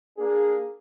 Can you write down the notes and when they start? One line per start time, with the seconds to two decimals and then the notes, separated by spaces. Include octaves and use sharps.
0.18 A#3 D4 G#4